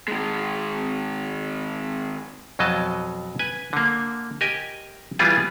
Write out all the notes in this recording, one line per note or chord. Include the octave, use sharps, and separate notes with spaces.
D#3 G#3
F2 B2 F#3 D#5 A5
B4 G#5
D3 A#3
G4 A#4 D#5 G#5
E3 G3 B3 F4 G4 G#4